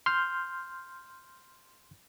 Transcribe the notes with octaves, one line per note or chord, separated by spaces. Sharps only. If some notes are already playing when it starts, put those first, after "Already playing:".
C6 F6 G6